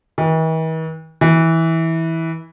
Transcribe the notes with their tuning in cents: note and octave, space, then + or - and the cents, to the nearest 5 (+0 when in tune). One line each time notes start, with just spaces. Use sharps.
E3 -45
E3 -15